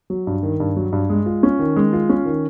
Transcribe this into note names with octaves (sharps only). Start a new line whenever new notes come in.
F#3
G2
D#3
G2
F#3
G2
G#3
F4
C#4
D#3
G#3
F4
C#4
D#3